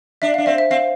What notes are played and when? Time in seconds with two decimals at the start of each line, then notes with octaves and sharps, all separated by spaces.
0.22 D4 E5
0.34 F5
0.38 D4
0.46 C4 E5
0.58 E5
0.71 C4 F5